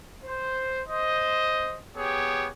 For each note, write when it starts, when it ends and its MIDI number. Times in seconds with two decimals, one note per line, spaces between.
0.24 0.81 72
0.87 1.79 72
0.87 1.79 75
1.96 2.49 59
1.96 2.49 67
1.96 2.49 68
1.96 2.49 73